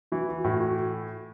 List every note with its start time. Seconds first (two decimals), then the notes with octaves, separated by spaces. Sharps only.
0.12 E3 F#4
0.29 F#4
0.44 A2 F#4
0.60 F#4